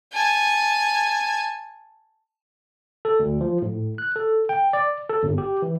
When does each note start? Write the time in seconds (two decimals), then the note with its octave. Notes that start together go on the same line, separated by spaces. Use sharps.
0.13 G#5 A5
3.05 A4
3.19 D2
3.41 F3
3.62 A2
3.98 F#6
4.16 A4
4.49 G5
4.73 D5
5.09 A4
5.23 G1
5.38 G4
5.62 E3